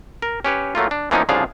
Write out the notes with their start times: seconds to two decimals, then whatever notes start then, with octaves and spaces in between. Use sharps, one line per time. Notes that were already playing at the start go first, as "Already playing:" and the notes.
0.22 A#4
0.45 C#4 G4 B4 C#5
0.75 F#3 A3 A#3 F4
0.91 D4
1.11 E3 F3 A#3 B3 C#4 D#4
1.29 C2 C#3 F3 D4 G#4 F5